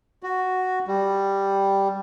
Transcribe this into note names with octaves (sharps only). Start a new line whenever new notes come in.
F#4
G3